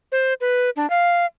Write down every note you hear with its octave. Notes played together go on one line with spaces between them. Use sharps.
C5
B4
D4
F5